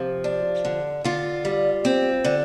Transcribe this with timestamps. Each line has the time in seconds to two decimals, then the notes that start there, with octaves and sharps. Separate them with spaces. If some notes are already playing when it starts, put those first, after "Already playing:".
Already playing: C3 F3
0.24 D4
0.65 D3
1.04 D3 F4
1.45 G3
1.85 C4
2.24 D3